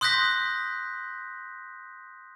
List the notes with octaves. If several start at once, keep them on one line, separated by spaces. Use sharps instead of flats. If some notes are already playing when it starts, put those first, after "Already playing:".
C6 D#6 F#6 G6 A#6 B6